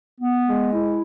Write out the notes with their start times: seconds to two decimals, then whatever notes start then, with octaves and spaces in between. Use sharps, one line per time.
0.21 B3
0.46 G#3
0.73 E4